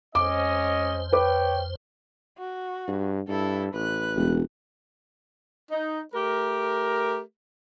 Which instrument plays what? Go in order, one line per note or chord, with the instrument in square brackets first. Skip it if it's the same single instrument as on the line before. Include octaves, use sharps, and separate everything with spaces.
[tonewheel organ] F2 C5 [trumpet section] G#3 C#4 D#5 [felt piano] D6
[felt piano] B4 D6 [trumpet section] C#5 G5
[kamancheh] F#4
[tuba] G2
[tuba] G2 [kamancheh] E4 A4
[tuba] A1 [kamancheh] B4 F#6
[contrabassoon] E1
[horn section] D#4
A3 G4 A#4